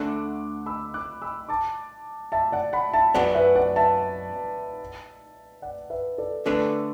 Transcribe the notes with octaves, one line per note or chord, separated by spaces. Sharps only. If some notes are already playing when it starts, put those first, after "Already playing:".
Already playing: D2 D3 A3 D4 D6 F#6
B5 E6
D6 F#6
B5 E6
A5 D6
E5 A5
D5 F#5
F#5 B5
E5 A5
F#2 F#3 B3 D5 F#5
B4 E5
D5 F#5
E5 A5
D5 F#5
B4 E5
A4 D5
D3 A3 D4 A4 B4 D5